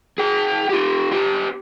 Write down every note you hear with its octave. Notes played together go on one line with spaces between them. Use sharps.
G#4 G5
F4 G4
B3 G4